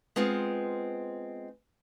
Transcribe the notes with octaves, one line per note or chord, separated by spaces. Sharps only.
G#3 B3 C4 F4